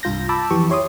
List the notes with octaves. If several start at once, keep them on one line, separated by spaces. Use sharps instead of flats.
C2 G2 F4 G6 A#6
A5 B5 D6 E6
F2 E3 G4 C#6
E4 G4 C#5 C6 D6 D#6